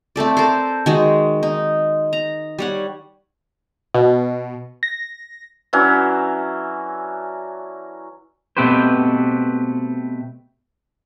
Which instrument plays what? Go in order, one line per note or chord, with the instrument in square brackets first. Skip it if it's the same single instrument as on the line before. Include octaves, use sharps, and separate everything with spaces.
[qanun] A3 C4 A4 D5
A4 A#4 C5
D#3 G#3 F#4
D#4
A#5
G3 C#5 F#5
[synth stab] B2
A#6
[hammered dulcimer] E3 F#3 C#4 D4
[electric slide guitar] B2 A3 C4 G4 B4 C5